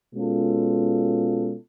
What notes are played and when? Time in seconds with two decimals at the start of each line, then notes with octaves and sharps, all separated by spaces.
0.14 B2 G#3 C#4 F4 A4